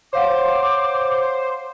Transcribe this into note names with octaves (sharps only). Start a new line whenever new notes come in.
C5 C#5 F5 F#5 D6